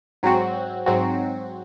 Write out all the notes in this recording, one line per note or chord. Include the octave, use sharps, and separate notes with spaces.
G#2 F#3 C4 F#4
G#2 F#3 C4 F#4